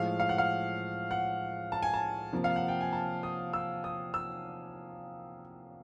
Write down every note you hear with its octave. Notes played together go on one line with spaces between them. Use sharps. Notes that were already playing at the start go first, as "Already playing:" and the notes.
Already playing: A2 F3 G#3 F5
F5
F#5
F5
F#5
A5
G#5
A5
C3 F3 A#3
F5
F#5
G5
G#5
A5
D#6
E6
D#6
E6